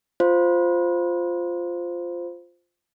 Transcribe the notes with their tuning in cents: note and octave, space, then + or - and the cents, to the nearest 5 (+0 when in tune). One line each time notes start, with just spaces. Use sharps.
F4 +0 C5 -5